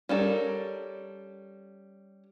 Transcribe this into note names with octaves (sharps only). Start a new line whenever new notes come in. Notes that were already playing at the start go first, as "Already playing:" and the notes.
G3 C#4 A4 A#4